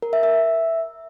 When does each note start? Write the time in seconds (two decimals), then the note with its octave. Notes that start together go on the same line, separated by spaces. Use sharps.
0.02 A#4
0.13 E5
0.23 E5